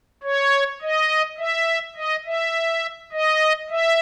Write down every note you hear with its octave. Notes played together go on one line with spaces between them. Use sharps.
C#5
D#5
E5
D#5
E5
D#5
E5